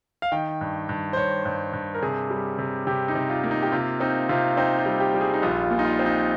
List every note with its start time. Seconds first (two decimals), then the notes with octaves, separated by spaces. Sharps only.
0.22 F5
0.32 D#3 G5
0.61 G2
0.89 G2
1.13 C5
1.17 G2 C#5
1.45 G2
1.73 G2
1.95 A#4
2.02 C3 G#4
2.31 G3
2.59 C3
2.87 C3 G4
3.08 D#4
3.15 C3
3.29 F4
3.44 A#3
3.51 D#4
3.63 G4
3.72 C3 F4
4.00 C4 D#4
4.29 C3 F4
4.57 C4 D#4
4.78 F4
4.86 G3
5.00 G4
5.14 G3
5.21 G#4
5.34 D#4
5.42 A#1 F4
5.64 F4
5.71 A#2
5.79 D#4
5.85 F4
5.99 C4
6.06 D#4